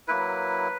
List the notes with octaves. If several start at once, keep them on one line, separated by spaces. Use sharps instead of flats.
F#3 A#3 E4 B4